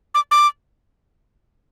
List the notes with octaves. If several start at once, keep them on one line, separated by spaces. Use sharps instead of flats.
D6
D6